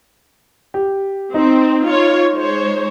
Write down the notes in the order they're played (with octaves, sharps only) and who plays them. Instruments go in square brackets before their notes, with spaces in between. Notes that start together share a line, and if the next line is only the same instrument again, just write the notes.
[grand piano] G4
[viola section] C4 [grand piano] D#4
[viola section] F4 C#5
G#3 C5 C#5